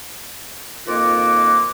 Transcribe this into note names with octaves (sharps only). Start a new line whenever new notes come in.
F2 D#3 A#3 F4 F#4 D6